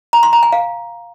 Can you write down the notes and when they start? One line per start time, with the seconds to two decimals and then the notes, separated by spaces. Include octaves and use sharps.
0.13 A#5
0.23 C6
0.33 A#5
0.43 G#5
0.52 F5